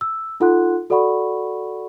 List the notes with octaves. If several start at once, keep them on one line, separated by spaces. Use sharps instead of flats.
E6
D#4 F4 A4 F#5 C6 F#6
F#4 A4 D5 F#5 B5 C#6